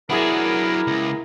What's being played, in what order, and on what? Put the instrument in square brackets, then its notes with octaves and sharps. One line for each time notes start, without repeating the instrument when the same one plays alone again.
[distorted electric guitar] F#3 D4 [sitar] B3 G#4 [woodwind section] E4 A#4
[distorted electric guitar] C#2